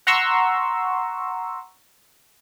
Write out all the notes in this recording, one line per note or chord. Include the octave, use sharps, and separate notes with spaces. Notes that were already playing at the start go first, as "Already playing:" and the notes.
F#5 A#5 C6 C#6 E6